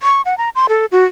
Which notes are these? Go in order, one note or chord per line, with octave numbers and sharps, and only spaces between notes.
C#6
F#5
A#5
C6
A4
F#4